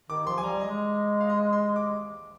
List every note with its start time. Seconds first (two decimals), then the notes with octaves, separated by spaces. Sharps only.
0.10 D#3 D6
0.27 F3 C6
0.38 G#5
0.43 G3 A#5
0.61 G#3 D#5
1.20 F5
1.30 D#5
1.53 C6
1.76 D6